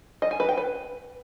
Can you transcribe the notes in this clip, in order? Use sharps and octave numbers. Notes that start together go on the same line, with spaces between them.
D#5
G#5
B4
G5
B4